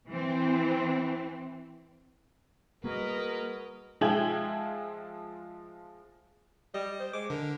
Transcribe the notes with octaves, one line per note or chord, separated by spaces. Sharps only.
E3 C4
G3 A#3 F#4 G#4 A#4 B4 D#5
F3 G#3 E5 G5 G#6 F#7
G3 D#5
C5
G#3 D6
D3 A#4